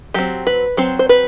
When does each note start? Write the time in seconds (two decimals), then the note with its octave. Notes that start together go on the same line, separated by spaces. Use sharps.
0.14 F#3 C4 G4
0.47 B4
0.77 F#3 C4 C5
0.99 C5
1.09 B4